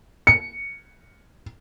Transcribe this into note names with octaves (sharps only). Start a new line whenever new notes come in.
C#7